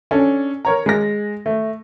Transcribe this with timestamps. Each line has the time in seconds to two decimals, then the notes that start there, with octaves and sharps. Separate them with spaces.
0.11 C#4 D4 A4
0.65 A#4 C#5 A#5
0.86 G#3 A#6
1.46 A3